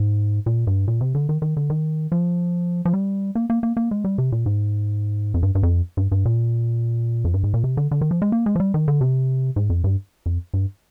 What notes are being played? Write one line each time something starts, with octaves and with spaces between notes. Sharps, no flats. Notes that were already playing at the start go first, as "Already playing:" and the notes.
Already playing: G#2
A#2
G2
A#2
C3
D3
D#3
D#3
D3
D#3
F3
F3
G3
A#3
A#3
A#3
A#3
G#3
G3
C3
A#2
G#2
F2
G2
G2
F2
G2
G2
A#2
F2
G2
G#2
A#2
C3
D3
D3
D#3
F3
G#3
A#3
G#3
F3
G3
D#3
D3
C3
G#2
F2
G2
F2
G2